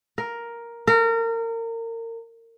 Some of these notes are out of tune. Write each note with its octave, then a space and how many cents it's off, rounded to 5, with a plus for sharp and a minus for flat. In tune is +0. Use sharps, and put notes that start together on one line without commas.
A#4 +5
A#4 -30